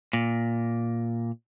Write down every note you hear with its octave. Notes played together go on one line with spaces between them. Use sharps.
A#2